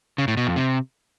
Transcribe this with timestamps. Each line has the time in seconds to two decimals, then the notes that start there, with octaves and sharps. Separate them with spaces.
0.18 C#3
0.28 A2
0.37 B2
0.47 F2
0.56 C3